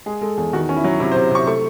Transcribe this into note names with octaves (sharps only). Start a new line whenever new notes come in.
G#3 G#4
G#3 A4
E2 G#4
D#3 F#4
C#4
E4
F#3
C3 E4
C5
C3
C3 C#6
A3 C#6